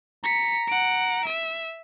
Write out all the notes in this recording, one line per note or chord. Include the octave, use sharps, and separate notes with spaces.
A#5 B6 C#7
F#5 D7
E5